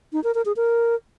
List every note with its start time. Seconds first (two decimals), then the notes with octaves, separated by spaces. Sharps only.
0.13 D#4
0.24 A#4
0.35 A#4
0.46 G#4
0.56 A#4